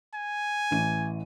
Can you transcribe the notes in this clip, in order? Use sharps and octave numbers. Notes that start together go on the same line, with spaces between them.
G#5
A1 E3 D#7